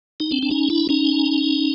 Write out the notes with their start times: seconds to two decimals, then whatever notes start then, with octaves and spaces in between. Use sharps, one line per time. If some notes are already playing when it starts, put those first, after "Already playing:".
0.20 D#4
0.31 C4 D4
0.43 D4
0.51 C#4 D#4
0.70 D4 E4
0.89 C#4 D#4